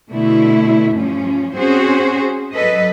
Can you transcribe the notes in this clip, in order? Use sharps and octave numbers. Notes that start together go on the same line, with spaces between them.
B2 D3 A3 E4
G2 F3 C#4
C4 C#4 F#4 G#4 C5
F#3 A4 B4 D#5